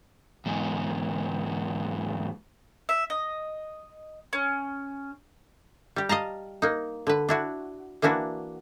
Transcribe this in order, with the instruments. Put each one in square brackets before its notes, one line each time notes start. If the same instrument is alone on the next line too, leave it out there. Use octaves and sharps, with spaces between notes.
[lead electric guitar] E2 G#2
[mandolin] E5
D#5
C#4
[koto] G3 G4
D#5 F5 A5 A#5
A#3 D#4
D3 B4
D4 E4 F#4
E3 A#3 D4 E4 F#4